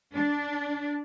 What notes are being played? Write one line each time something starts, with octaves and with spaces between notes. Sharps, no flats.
D4